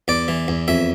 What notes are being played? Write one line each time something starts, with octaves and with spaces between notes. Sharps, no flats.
E2 D5
E3
E2
F2 E5